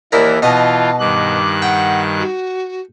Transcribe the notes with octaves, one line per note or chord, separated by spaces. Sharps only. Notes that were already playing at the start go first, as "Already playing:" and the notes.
D#2 E3 E4 A#4 D5
B2 E3 F4 D#5 A5 D#6
G2 D#3 D6 F#6
F#5 G5
F#4